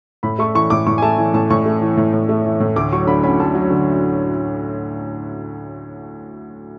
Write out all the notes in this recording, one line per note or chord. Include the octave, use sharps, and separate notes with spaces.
A2 B5
A3 C#6
E3 C#6
A2 D6
A2 C#6
G#5
A3 A5
E3 G#5
A2 A5
A2 C#6
A3
E3
A2
A2
A3
E3
A2
D2 D6
F#3 C#6
D3 B5
C#4 B5
D2 A5
F#3
D3